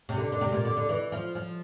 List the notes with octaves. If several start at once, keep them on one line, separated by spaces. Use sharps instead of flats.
C3
D3
D3
C3
A#2
D3
D3
E3
F3
F3